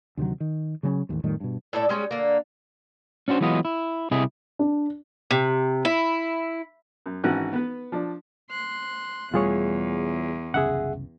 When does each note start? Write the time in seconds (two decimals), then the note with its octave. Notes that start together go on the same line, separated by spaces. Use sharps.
0.17 D2 C3 D#3 F#3
0.40 D#3
0.83 C#3 F#3 B3 C#4
1.09 A1 D#2 G#2
1.24 F2 A2 D#3 G3
1.40 G2 B2
1.73 A2 E4 A4 D5
1.89 G3 G#3 C4 C#4
2.11 D3 A#3
3.28 C#4 D4 F#4 C5
3.41 E3 F#3 G#3 B3 F4 D#5
3.65 E4
4.11 C2 C3 E4 G#4 D#5
4.59 D4
5.31 C3
5.85 E4
7.06 F#2
7.24 G#1 E3 C#4 F#4 F#6
7.53 B3 B4
7.92 F3 D4
8.50 C6 F#6
9.34 E1 E2 G3 A3 F4 G#4 C#5
10.54 F#1 C2 C#3 G#4 E5 F#5